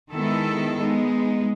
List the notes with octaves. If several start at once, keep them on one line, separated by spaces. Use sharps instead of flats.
D#3 G#3 B3 E4 A4
G#3 B3 D#4